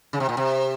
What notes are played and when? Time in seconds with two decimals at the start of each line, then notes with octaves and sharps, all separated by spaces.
0.13 C#3
0.20 C3
0.29 A#2
0.37 C3